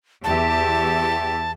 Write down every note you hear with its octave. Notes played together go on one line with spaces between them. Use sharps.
E2 G4 E5 A5